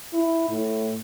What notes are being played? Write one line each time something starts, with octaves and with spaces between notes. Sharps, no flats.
E4
A2